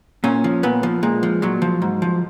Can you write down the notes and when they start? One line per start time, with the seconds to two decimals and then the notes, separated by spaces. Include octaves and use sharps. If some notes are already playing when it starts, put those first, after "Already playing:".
0.24 A#2 C#4
0.44 F3
0.63 A#2 B3
0.83 F3
1.03 A#2 G#3
1.23 F3
1.42 A#2 F#3
1.62 F3
1.82 G#2
2.02 F3